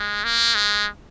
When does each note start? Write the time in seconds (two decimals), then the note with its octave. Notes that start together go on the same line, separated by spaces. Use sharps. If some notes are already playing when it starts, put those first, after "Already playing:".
Already playing: G#3
0.24 A#3
0.55 G#3